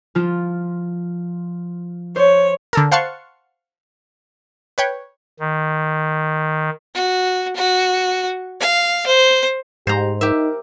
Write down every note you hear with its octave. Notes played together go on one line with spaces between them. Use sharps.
F3 F4
C5 C#5
D3 A4 A#4
C5 F5 F#5 A5 C6 C#6
B4 C#5 G5
D#3
F#4
F#4
F5
C5
G#2 G4 C5 A#5
D#4 G4 A#4 E5